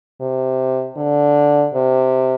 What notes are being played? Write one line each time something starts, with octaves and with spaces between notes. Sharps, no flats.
C3
D3
C3